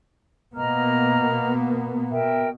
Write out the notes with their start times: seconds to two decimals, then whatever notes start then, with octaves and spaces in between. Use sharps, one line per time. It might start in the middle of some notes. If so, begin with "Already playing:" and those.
0.55 B2 A#3 B3 D#5 A#5 F6
2.10 B2 A#4 E5 G5